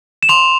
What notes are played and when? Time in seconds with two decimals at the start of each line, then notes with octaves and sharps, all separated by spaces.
0.23 E7
0.29 C6 F7